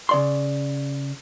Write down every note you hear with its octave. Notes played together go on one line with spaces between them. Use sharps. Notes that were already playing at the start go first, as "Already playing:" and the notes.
C#3 D5 C6